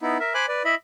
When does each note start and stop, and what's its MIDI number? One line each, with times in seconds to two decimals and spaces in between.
0.01 0.18 59
0.01 0.18 63
0.01 0.18 64
0.20 0.33 70
0.20 0.33 76
0.34 0.46 72
0.34 0.46 80
0.34 0.46 83
0.34 0.46 86
0.34 0.46 90
0.48 0.63 71
0.48 0.63 74
0.65 0.75 64
0.65 0.75 75
0.65 0.75 76
0.65 0.75 83